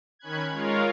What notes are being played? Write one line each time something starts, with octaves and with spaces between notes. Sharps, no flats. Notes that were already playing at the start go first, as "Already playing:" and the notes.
D#3 C#4 B5 F#6 G#6
G#3 F4 A#4 C#5 F5